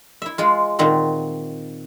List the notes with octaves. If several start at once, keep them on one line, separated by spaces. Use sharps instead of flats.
E4 E5
G#3 F4
A#2 D#3 C4 F#4